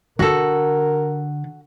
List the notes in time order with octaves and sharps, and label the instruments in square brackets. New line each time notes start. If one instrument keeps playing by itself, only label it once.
[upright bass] D3 [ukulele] F#4 A4 [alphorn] A#4